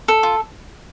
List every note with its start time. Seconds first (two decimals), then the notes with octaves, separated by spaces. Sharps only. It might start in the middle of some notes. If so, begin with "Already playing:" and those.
0.08 A4
0.23 F4